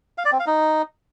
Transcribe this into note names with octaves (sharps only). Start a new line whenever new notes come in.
F5
D5
C4
F5
D#4